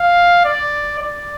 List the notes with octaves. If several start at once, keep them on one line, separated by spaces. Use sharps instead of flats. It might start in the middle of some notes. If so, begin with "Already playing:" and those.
Already playing: F5
D5
D5